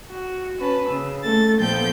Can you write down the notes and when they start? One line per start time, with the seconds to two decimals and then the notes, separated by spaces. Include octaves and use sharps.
0.12 F#4
0.59 C#4 B4 A5
0.89 C#3 E6
1.23 A3 A4 A6
1.60 A#2 F3 B3 A4 G5 G6